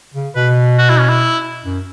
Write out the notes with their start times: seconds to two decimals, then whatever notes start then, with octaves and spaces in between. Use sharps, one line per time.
0.14 C#3
0.35 B2 B4
0.78 F#4
0.89 E4
0.99 C#4
1.09 E4
1.64 F#2